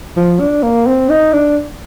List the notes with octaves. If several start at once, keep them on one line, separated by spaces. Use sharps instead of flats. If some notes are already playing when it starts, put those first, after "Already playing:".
F3
D4
A#3
C4
D#4
D4